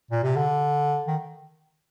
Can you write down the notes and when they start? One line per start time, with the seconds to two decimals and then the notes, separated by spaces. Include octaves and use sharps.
0.11 A#2
0.23 C3
0.36 D3
1.08 D#3